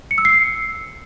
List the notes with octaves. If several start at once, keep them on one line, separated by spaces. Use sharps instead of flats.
C#7
E6
C7